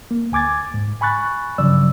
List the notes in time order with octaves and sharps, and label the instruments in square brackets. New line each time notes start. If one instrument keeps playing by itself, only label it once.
[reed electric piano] A#3
D2 G#5 D6 G#6 A6
G#2
G#5 B5 C#6 F#6 A6
G2 C#3 F3 F#3 D5 E6